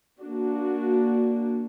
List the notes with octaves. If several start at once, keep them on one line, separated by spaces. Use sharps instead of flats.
A#3 D4 F#4